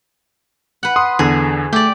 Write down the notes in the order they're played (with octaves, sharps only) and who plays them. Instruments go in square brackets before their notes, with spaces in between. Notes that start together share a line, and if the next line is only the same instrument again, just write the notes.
[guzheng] B4 F#5
[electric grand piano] C6 D#6
[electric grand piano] E2 D3 [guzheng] G#4
[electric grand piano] A3 [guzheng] G4 D5